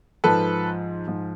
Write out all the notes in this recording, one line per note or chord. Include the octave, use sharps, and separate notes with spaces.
G#2 F3 A4 B4
G#2 F3